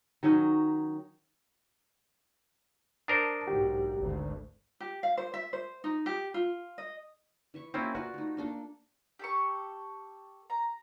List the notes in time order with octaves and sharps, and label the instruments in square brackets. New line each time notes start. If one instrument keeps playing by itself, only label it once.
[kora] D#3 F#3 C#4 D#4
[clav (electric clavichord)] D4 A#4 C5 [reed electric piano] A5 D#6
[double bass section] B1 G#2 [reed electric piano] F#4 G4
[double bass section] G#1 D2
[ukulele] G4
F5
C5
E5
C5
D#4
G4
F4
D#5
[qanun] E3 E5 C#6
[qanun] A#3 F#4 G5 [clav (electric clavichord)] C4 C#4 E4
[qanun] F4 B4 D5 [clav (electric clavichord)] F#4
[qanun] A3 D#4
A#3 D4 A4
[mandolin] G4 A4 C#6
A#5